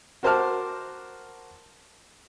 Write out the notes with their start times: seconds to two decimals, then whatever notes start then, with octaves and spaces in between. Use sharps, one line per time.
0.23 F#4 A#4 C5 A5 D6 F6